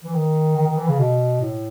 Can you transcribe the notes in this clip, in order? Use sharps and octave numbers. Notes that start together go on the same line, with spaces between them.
E3
D#3
D#3
D#3
E3
C#3
B2
A2